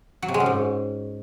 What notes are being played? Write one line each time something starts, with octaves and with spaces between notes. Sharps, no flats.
F#3
C3
G#3
F#2
G#2